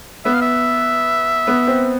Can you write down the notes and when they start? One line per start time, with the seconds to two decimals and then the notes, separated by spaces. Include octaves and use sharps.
0.25 B3 E5
0.34 F5
0.41 E5
1.47 B3
1.67 C4